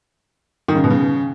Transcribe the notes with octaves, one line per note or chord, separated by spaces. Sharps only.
D#3
C#3
B2
C#3